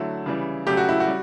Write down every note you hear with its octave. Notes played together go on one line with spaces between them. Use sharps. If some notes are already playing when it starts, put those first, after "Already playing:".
Already playing: D3 F#3 A3 E4
C#3 E3 G3
C#3 F#3 A3 G4
F#4
E4
F#4
G3